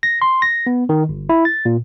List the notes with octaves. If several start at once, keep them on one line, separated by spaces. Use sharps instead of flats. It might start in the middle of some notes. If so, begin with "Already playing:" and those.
A#6
C6
A#6
B3
D#3
G1
E4
A6
A#2